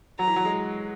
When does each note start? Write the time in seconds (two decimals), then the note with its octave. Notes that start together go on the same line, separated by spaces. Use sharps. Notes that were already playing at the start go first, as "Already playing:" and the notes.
0.19 F#3 A#5
0.27 E3
0.36 F#3
0.45 G#3